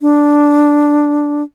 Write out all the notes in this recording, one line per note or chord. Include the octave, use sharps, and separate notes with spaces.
D4